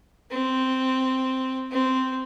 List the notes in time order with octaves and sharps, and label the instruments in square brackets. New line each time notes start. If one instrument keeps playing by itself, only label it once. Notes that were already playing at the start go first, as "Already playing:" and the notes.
[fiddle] C4
C4